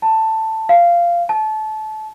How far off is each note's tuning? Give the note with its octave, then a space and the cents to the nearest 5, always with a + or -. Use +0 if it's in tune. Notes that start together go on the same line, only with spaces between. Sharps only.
A5 +10
F5 -15
A5 -25